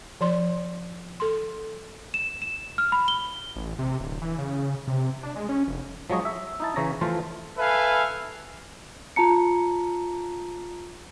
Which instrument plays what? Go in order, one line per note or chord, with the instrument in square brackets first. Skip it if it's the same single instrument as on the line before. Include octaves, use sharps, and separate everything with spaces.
[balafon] F3 D5 C6
A4 C6
[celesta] E7
E7
F6
B5
G7
[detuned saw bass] A1
C3
D1
E3
C#3
C3
D4
G#3
C#4
F1
[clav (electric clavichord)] F3 F#3 G#3 C#5 D#5
E5
D#4 E4 A5
C#3 E3 C#5 A#5
E3 F3 A3 F4 C5
[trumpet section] A4 B4 E5 F5 G#5
[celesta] F4 A5 A#5 C#7